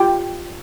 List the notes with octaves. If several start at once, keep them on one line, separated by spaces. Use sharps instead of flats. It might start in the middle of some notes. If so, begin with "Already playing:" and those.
Already playing: F4 G4 G5